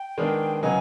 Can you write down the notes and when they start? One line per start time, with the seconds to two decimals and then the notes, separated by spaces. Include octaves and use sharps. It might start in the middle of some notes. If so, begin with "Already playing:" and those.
Already playing: G5
0.18 D#3 G#3 B3 D4
0.63 C#3 F#3 B3 D#4 G#5